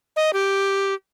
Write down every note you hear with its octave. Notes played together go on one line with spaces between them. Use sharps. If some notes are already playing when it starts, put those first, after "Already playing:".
D#5
G4